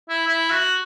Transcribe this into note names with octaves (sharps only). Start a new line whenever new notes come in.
E4
E4
F#4